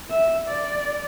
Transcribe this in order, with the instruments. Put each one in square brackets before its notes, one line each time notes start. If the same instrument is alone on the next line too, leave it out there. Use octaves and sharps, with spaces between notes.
[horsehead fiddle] E5
D5